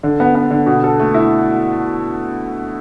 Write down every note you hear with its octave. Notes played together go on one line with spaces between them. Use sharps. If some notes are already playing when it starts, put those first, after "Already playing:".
D3
B3
B3
D3
B2
A4
A3
E4